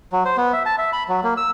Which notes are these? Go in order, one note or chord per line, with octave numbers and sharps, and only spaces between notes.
F#3
C5
B3
E5
A5
E5
B5
F#3
A#3
E6